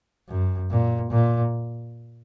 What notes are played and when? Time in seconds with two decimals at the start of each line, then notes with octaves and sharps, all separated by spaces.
0.29 F#2
0.70 A#2
1.11 A#2